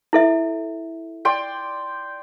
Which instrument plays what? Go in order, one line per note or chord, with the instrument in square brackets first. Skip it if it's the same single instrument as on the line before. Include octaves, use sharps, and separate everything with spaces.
[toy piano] E4 A4 E5
[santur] D5 G5 C6